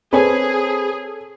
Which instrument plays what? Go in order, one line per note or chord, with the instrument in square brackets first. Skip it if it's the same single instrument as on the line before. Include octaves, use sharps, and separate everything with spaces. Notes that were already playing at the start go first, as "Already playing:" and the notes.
[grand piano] C4 [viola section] G#4 [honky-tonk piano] A4 C#5 [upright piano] B4 G#5